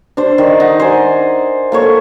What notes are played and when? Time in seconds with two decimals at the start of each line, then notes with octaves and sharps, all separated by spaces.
0.17 D4 C5
0.38 D#3 D5
0.60 D#4 F#5
0.80 C5 D5 G#5
1.72 A#3 A4 C#5